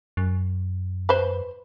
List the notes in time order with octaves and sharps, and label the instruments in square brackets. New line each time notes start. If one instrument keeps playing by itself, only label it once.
[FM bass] F#2
[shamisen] B4 C5